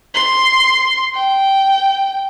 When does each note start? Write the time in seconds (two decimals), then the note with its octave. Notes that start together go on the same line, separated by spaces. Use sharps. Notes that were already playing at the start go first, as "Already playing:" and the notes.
0.14 C6
1.15 G5